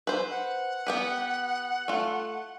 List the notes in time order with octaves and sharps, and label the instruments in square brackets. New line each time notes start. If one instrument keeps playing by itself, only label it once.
[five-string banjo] B4 C5
[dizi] F#5
[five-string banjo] B3 G4 B4
A3 F4